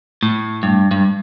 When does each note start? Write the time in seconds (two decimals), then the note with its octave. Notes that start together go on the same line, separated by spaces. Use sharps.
0.23 A2
0.63 G2
0.91 G2